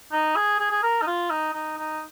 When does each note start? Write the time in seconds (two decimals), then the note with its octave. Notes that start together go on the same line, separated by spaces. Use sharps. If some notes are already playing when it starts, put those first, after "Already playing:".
0.12 D#4
0.36 G#4
0.60 G#4
0.71 G#4
0.83 A#4
1.02 D#4
1.07 F4
1.30 D#4
1.53 D#4
1.77 D#4